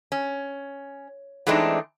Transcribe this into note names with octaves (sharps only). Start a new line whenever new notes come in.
C#4
E3 G#3 A3 C4 D4 D#4